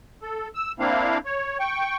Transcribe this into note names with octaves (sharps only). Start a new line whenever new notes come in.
A4
E6
A#3 C4 D4 E4 F5
C#5
G5 C#6